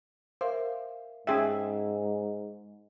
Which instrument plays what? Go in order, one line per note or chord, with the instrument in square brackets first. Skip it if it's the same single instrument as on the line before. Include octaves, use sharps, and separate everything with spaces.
[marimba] A#4 E5 F5 [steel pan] C5
[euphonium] G#2 [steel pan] C#4 G#4 E5 [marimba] G5 C6 E6